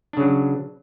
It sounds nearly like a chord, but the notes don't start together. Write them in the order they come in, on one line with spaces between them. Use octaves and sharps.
D4 C#3 F#3